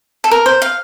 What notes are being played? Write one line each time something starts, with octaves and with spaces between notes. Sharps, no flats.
A4
A#4
C5
F5